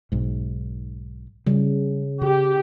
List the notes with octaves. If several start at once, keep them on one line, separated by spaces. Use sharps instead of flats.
B1 G#2
C#3 G3
C#3 G4